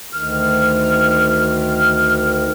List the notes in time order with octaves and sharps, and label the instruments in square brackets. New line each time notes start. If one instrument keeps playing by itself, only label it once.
[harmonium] D2 D#3 [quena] F6